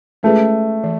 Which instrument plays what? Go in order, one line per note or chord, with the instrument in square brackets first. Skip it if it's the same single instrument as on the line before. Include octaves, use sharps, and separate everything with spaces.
[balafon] G#3 C#4 F4 G#4 B4 [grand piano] A3
[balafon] E3